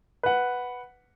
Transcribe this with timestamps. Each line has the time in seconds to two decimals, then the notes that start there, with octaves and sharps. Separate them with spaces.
0.23 B4 F#5